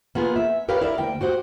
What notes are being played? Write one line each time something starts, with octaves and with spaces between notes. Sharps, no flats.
A#3 B3 F4 G#4
E5
G4 A#4 B4 C#5 F5 G5
E4 A#4 D5
D2 A#3 G5
F#4 G4 C5 F#5